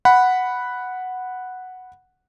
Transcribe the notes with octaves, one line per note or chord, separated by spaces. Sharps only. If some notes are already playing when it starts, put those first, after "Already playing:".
F#5 B5